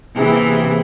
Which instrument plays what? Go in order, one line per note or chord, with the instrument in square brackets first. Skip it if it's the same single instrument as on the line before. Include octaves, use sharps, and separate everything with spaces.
[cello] C3 E3 [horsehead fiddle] A#3 G#4